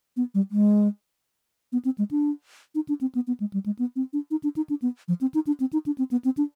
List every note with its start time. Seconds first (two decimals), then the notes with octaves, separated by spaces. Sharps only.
0.17 B3
0.34 G3
0.51 G#3
1.72 B3
1.85 C4
1.98 G#3
2.11 D4
2.75 D#4
2.88 D4
3.01 C4
3.15 B3
3.27 B3
3.40 G#3
3.53 G3
3.66 G#3
3.79 B3
3.96 C4
4.13 D4
4.31 D#4
4.43 D4
4.56 D#4
4.69 D4
4.82 B3
5.08 F3
5.21 C4
5.34 D#4
5.47 D4
5.60 C4
5.73 D#4
5.86 D4
5.98 C4
6.11 B3
6.24 C4
6.37 D4